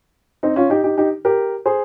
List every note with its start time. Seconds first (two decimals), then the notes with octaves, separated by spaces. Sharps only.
0.43 C4 D#4
0.56 C#4 F4
0.70 D#4 G4
0.84 D#4 G4
0.98 D#4 G4
1.25 G4 A#4
1.66 G#4 C5